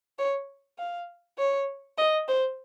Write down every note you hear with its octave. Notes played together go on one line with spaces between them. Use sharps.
C#5
F5
C#5
D#5
C5